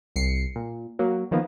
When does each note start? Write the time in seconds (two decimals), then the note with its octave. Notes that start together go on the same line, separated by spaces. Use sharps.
0.16 C2 C7 C#7
0.56 A#2
0.99 F#3 A#3
1.31 D#3 F3 A#3 B3